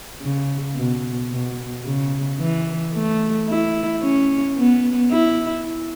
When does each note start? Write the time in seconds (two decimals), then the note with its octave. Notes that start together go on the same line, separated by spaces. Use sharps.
0.22 C#3
0.76 B2
1.31 B2
1.85 C#3
2.39 E3
2.94 A3
3.48 E4
4.03 C#4
4.57 B3
5.12 E4